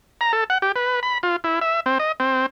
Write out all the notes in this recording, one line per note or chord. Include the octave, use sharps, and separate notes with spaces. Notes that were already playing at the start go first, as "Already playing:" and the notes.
A#5
A4
F#5
G4
B4
B5
F4
E4
E5
C4
D#5
C4